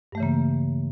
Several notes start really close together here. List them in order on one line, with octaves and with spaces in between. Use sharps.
G2 A3 E3 C#3 A#3